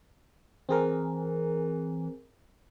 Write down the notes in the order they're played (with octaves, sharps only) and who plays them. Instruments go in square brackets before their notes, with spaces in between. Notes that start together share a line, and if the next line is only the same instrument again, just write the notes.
[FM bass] E3 [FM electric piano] C4 G#4 A#4